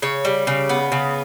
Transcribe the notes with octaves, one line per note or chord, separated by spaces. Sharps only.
C#3 C#5
G3
C#3
B3
C#3